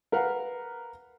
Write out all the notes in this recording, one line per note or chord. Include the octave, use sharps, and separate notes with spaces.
A#4 B4 F5 F#5